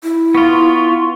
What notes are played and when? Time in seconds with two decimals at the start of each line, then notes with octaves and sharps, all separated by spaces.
0.04 E4
0.35 B3 F4 C#6